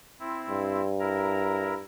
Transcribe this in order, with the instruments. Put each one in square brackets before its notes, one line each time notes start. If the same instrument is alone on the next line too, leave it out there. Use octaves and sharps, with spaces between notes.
[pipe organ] C4 E4
[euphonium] G2
[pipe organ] E4 A#4 A#5